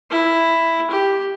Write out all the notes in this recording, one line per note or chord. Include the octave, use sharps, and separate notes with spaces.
E4
G4